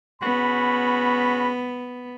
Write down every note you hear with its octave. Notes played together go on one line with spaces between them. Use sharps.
C#3 B3 F#4 B5